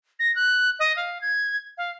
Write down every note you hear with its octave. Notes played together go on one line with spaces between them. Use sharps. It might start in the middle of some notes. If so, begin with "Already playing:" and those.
A#6
F#6
D#5
F5
G#6
F5